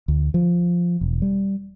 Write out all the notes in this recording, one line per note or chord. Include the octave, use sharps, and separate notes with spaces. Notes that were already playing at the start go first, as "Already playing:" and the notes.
D2
F3
E1
G3